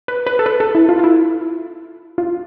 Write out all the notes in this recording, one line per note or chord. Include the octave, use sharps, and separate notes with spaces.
B4
B4
A4
B4
A4
E4
F4
F4
E4
F4